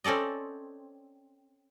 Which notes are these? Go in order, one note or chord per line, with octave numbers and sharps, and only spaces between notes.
C4 C#4 A4 D5 D#5